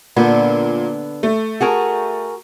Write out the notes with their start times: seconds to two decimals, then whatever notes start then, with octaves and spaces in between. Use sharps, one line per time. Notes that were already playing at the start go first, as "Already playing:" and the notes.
0.16 A#2 D3 B3
1.23 A3
1.61 F#4 G#4 A#4